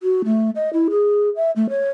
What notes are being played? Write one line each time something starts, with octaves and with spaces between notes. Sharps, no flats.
F#4
A3
D#5
E4
G#4
E5
A3
C#5